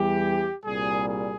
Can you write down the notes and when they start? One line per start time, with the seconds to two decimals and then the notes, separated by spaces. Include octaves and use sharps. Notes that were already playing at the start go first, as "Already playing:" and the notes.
Already playing: E2 E3 G3 G4
0.64 C2 A#2 G3 G#4
1.08 G#4